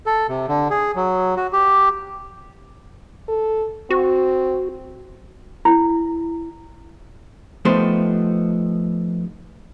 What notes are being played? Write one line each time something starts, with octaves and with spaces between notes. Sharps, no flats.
A4
C3
D3
G#4
F#3
F#4
G4
A4
C4 F#4
E4
F3 A3 B3 D#4 G4 C5